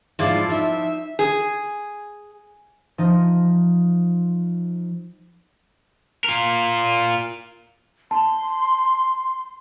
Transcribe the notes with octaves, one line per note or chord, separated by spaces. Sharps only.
G#2 F3 E4 F4 D5 F5
D#4 E5
G#4
F3 D#4
F4 A#4
A5 C6